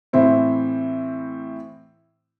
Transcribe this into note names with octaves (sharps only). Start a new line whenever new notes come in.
A2 E3 C4 E4